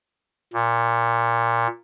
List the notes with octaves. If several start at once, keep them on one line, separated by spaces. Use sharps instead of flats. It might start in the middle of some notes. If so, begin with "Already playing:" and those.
A#2